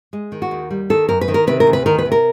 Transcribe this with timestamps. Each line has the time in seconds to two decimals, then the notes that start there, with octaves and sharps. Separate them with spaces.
0.13 G#3
0.32 D#3
0.42 F#4
0.51 D#2
0.71 G3
0.90 D#3 A4
1.09 F#2 A#4
1.21 B4
1.28 D#3
1.34 A#4
1.47 C3 B4
1.60 A#4
1.67 D2
1.73 B4
1.86 D#3 A#4
1.99 B4
2.05 C3
2.12 A#4